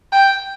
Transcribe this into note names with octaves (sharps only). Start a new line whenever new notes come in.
G5